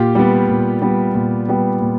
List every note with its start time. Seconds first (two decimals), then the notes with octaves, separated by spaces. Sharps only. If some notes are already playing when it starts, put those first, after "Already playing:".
Already playing: A#2 F4 G4
0.15 G3 B3
0.49 A#2
0.82 G3 B3
1.14 A#2
1.48 G3 B3
1.82 A#2